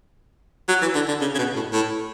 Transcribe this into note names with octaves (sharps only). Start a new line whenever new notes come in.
F#3
E3
D3
D3
C#3
C#3
B2
A2
A2